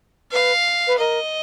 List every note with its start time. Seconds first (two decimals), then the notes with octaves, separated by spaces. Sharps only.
0.32 B4 F5
0.87 B4
0.99 A#4 D#5